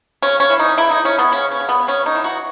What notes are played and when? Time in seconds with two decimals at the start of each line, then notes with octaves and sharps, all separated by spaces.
0.22 C#3 C#4
0.40 C#4
0.50 E3
0.59 D#4
0.77 C#3 E4
0.91 D#4
1.05 C#3 C#4
1.19 B3
1.32 C#3 C#4
1.51 C#4
1.60 C#3
1.69 B3
1.87 C#3 C#4
2.06 D#4
2.15 E3
2.24 F#4